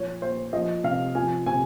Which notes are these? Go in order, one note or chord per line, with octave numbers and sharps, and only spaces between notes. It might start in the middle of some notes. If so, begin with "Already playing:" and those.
Already playing: A#2 F3 C#5
A#2 C5
F3 D#5
C3 F5
F3 G#5
C3 G#5